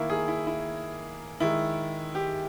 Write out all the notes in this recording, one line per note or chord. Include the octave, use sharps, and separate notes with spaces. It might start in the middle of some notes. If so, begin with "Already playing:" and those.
Already playing: D#3 A#3 E4
G#4
E4
E4
D#3 G#3 E4
G4